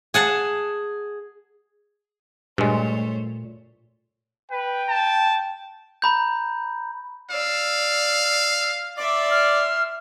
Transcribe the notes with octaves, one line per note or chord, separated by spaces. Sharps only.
G#4 F#5 A5
G2 A#2 G#3 A3 C5 C#5
B4 G5
A5
A#5 B5 G6
D5 F5 E6
D5 E5 C6
F6